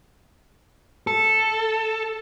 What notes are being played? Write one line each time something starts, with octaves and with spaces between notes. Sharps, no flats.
A4